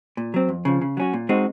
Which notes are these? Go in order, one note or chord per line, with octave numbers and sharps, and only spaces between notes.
A#2
F#3 C4
F2
C#3 F3
C#3
F#3 C#4 F#4
A#2
G#3 C4 D#4 F#4